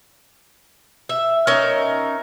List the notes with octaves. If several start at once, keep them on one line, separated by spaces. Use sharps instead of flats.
E5
C#4 D#4 A#4 E5